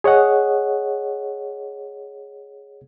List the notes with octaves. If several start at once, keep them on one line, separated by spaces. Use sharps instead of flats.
G#4 C#5 D#5 F#5